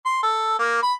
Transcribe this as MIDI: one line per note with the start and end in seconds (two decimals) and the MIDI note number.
0.06 0.22 84
0.23 0.59 69
0.59 0.81 58
0.83 0.93 83